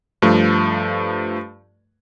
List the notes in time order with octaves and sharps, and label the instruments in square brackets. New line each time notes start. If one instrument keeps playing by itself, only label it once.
[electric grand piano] G2 F3 A3